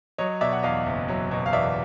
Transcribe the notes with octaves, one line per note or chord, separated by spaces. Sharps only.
F#3 C#5 D#5
B2 D5 E5
F#5
E2 D#5 F5
F#1
F#3
B2
F5
E2 D5 E5